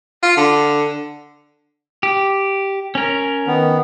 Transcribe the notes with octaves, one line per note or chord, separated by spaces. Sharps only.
F4
D3
G4
C#4 A#4
D#3 B3